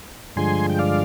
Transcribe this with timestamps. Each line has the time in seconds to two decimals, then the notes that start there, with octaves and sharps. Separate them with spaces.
0.36 G2 D3 F3 G#3 G#5 C6
0.70 G5
0.79 D5 F5